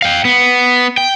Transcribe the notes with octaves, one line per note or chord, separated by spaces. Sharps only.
F5 G5
B3
G5